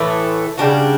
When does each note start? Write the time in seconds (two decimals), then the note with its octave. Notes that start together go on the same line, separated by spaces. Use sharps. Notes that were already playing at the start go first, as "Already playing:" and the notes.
Already playing: A2 E3 A3
0.58 C#3 G3 D4 F#4